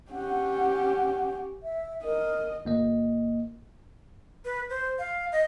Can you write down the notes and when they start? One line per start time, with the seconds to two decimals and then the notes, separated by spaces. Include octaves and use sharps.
0.12 C#4 G4 F#5
1.63 E5
2.04 A#4 D#5
2.65 G1 A#3 D#5
4.45 B4
4.70 C5
4.99 F5
5.32 D#5